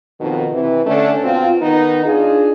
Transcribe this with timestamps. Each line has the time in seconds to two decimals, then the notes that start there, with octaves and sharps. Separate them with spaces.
0.20 F2 B2 D#3
0.53 C3 E3
0.86 D3 A3 C#4 D4
1.24 B2 C4 F4
1.62 D#3 B3 D#4
2.06 D4 D#4 F4 G#4